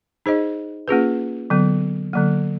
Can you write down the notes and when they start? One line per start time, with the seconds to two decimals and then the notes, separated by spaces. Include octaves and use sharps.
0.26 D#4 G#4 C5 D#5
0.88 A#3 C#4 F4 G#4 B4
1.50 D3 F#3 B3
2.13 D3 F#3 A#3